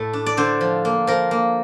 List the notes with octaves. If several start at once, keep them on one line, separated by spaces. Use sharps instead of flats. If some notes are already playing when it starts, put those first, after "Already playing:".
Already playing: A2 A3
D4
D5
D3 C5
F3
A#3
F3 A#4
A#3